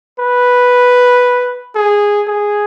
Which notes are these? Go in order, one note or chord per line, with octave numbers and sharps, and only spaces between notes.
B4
G#4
G#4